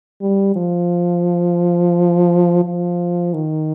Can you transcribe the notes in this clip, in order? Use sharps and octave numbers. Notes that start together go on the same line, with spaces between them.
G3
F3
F3
D#3